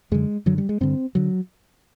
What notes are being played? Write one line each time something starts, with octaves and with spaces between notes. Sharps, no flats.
F#2 D3 G#3
F#2 D3 F#3
G3
G#3
G2 D3 C4
D3 F#3